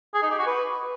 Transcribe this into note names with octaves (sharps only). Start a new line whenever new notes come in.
G#4
D#4
G4
F#4
B4